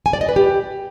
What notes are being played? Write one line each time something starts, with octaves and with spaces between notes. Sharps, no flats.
G#5
D5
D#5
B4
G4